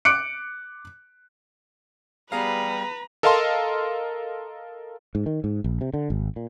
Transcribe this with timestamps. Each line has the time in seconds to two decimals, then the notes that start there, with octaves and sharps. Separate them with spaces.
0.05 D6 F#6 C#7 D7
2.32 G3 B3 G#4 B4 F5 A#5
3.23 A4 A#4 D#5 F5 A5 C6
5.15 G#2
5.26 D#3
5.44 G#2
5.64 A#1
5.81 C3
5.94 D3
6.10 G#1
6.36 A#2